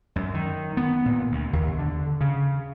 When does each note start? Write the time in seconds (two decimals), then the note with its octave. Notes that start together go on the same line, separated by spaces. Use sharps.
0.16 F#2
0.34 D#3
0.77 B3
1.06 A#2
1.32 D2
1.53 D#2
1.79 D3
2.21 C#3